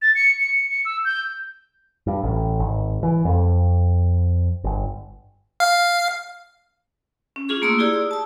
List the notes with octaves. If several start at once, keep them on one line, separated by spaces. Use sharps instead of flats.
A6
C#7
C#7
C#7
E6
G6
G2
A1
G#1
E3
F2
G1
F5
C#4
D4 F4 G#4 C#6
A3 A#3 A#5 C6 D#6 E6
E4 F4 G4 G#4 D5
D#6
A5 E6